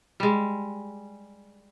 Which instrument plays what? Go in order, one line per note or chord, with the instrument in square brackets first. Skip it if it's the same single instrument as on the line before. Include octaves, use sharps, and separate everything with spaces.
[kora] G3 G#3